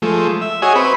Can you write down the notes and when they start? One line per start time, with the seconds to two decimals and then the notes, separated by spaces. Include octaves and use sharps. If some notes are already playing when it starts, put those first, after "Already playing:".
0.02 F3 G#3 A3
0.41 E5
0.62 F#4 G#4 C#5 D#5 E5 G#5
0.75 C4 B4 B5 C#6